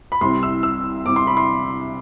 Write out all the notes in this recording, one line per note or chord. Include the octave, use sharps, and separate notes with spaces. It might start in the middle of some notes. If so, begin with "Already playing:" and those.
B5
C2 C3 G3 C4 E4 C6
E6
E6
C2 C3 G3 C4 E4 D6
C6
B5
C6